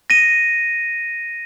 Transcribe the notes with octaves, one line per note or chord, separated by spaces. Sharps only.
A#6 D#7